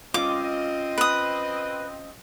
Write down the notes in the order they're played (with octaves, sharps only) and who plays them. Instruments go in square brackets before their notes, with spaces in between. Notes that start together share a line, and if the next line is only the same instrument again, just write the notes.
[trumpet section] C4 D#5 [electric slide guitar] C#4 F4 [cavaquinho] D6
[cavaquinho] B4 D#6